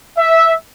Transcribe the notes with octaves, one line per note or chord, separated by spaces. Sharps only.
E5